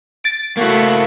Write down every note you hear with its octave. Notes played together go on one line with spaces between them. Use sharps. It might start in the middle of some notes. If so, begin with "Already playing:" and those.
A6 D7
A3 A#3 E4 F#4